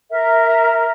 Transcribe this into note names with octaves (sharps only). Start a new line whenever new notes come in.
A#4 E5